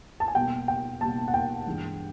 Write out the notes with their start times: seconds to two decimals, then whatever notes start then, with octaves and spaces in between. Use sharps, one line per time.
0.20 A5
0.28 G#5
0.35 B2 G3 A#3 G5
0.68 G5
1.01 B2 G3 A#3 A5
1.28 F#5
1.34 G5
1.67 G2 E3 G#3